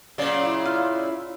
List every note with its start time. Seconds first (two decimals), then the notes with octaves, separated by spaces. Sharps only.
0.18 A#2 C#3 F#3 D5
0.41 E4
0.65 F4